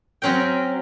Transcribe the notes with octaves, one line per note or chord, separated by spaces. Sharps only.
F#3 C4 C#4 A#4 G5